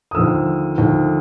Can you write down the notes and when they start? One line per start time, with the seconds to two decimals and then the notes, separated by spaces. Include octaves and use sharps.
0.11 D#6
0.15 D#2 D3 F3 A3 E6
0.78 D#2 D3 F3 A3